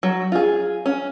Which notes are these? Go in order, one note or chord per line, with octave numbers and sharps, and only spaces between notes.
F#3
F4 G#4
C#4